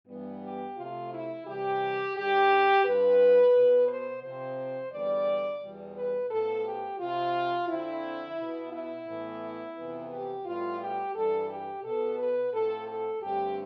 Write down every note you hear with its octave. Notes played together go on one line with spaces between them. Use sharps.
G2 E3 G3 B3
G4
C3 F3 A3 F4
E4
C3 E3 G3 G4
G2 D3 G3 G4
G2 F3 C4 B4
B2 B3
C5
C3 F3 C4 C5
E2 D3 G3 B3 D5
E2 B2 G3
B4
A2 F3 B3 A4
G4
C3 F3 C4 F4
F2 D3 F3 C4 E4
B2 B3
E4
A2 E3 B3
F2 C3 E3 B3
G4
A2 G3 B3 F4
G4
G2 E3 G3 A4
G4
B2 B3 A4
B4
A2 F3 C4 A4
A4
G2 D3 A3 C4 G4